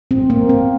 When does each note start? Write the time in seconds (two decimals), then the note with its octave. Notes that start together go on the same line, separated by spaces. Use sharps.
0.11 C4
0.30 A#3
0.49 C4